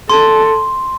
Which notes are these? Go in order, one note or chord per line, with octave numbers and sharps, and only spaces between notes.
A4 C6